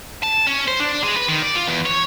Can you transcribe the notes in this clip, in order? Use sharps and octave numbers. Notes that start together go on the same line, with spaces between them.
A5
C#4
C5
D4
G#3
B4
D#3
D5
F4
E2
C#5